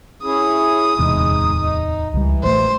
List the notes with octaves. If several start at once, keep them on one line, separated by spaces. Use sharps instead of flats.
C#4 E4 G#4 D#6
D1 E2 C3 G#3 D#4
D#4
C#2 E3 G3
A1 A3 C5